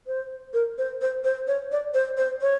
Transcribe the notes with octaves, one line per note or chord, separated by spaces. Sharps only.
C5
A#4
C5
C5
C5
C#5
D5
C5
C5
C#5